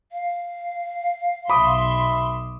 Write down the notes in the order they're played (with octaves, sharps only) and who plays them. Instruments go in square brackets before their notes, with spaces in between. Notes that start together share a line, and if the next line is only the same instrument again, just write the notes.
[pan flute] F5
[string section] B1 E5 C6 [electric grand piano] B5 D6 D#6